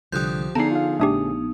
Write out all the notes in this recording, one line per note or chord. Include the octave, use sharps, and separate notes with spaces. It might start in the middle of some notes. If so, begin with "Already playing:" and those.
C2 D3 F3 G4 D#6 F#6 G6
D3 F3 B3 D#4 G#4 A5 A#5 C7
F4 F5
A#1 A3 D4 G4 D#6